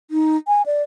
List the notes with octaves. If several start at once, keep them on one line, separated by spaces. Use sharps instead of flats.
D#4
G#5
D5